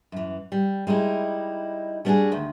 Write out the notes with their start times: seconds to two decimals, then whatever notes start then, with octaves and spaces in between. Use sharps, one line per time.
0.12 F#2 E3
0.52 G3
0.87 G3 G#3 D#4 E4
2.05 G3 B3 D4 E4 F#4 G#4
2.32 D2 D#3